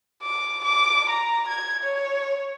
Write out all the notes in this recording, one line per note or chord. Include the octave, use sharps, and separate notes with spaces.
D6
D6
A#5
G#6
C#5